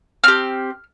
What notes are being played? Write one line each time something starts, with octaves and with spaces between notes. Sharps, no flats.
C4 G4 F6